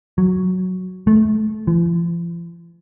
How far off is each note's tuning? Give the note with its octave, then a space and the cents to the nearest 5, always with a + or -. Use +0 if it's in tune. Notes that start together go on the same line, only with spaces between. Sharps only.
F#3 -5
A3 -25
F3 -45